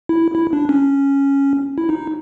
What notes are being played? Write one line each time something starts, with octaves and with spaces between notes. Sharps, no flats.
E4
E4
D4
C#4
E4
D#4